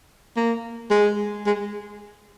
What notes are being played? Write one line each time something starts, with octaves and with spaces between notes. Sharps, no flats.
A#3
G#3
G#3